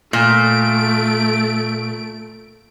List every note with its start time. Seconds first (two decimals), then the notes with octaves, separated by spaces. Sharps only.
0.13 A#2 A3 D7